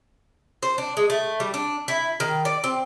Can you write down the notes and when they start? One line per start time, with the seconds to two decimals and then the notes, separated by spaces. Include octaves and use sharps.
0.63 C5
0.78 D4
0.97 G#3
1.10 A3
1.40 G3
1.54 D4
1.88 E4
2.20 D#3
2.45 D5
2.64 C4